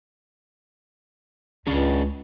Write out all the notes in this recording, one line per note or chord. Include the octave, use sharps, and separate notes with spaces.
C#2 C#4 D4 G#4